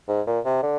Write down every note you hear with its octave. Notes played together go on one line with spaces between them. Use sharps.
G#2
A#2
C3
D3